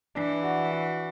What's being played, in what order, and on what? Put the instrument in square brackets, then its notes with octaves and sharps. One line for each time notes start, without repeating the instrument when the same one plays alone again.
[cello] E3 [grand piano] D4
[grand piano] F#4
F#4